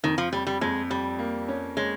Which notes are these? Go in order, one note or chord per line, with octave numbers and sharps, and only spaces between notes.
F2 D#3
F3
F2 G3
G3
F2 G#3
F2 G3
A#3
C#4
G#3 C#4